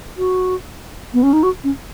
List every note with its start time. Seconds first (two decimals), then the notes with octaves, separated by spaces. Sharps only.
0.18 F#4
1.13 B3
1.23 C#4
1.33 D#4
1.43 F#4
1.64 C#4